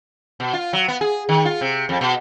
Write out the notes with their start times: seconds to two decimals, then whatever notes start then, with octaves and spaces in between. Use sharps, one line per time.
0.40 B2
0.53 F4
0.73 F#3
0.88 B3
1.01 G#4
1.29 D#3
1.45 F4
1.61 C3
1.89 F2
2.01 B2